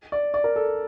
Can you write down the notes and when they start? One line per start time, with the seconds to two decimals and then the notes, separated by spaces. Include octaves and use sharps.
0.12 D5
0.34 D5
0.44 A#4
0.56 A4